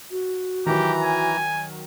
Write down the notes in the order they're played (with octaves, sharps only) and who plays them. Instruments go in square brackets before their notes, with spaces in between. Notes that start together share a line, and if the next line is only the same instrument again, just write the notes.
[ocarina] F#4
[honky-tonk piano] D#3 F#3 [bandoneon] E3 A#5 [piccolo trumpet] G4
[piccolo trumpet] G#5